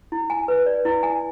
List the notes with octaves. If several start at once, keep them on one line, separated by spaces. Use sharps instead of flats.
E4
G#5
B4
D5
E4
G#5